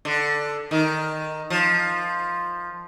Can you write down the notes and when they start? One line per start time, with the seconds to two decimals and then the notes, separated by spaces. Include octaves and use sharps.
0.05 D3
0.71 D#3
1.50 F3